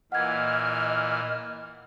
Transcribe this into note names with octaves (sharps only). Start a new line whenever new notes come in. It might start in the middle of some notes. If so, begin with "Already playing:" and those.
A#2 E3 D#5 F#5 F6 G#6